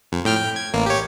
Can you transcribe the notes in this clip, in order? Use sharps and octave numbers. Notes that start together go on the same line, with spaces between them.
F2
A2 G5 F6
G5
G#6
A1 A#3
G4 C#5